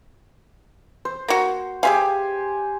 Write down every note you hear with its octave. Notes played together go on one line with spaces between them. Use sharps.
C5
A#3 F#4
G4 G#4 C5 E5 F5 G#5